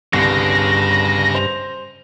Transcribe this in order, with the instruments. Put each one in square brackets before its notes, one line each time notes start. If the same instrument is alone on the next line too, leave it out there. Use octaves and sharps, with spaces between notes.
[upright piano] G1 C2 [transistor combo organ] G2 [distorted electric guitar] C#3 [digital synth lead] A#6
[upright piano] C5 F7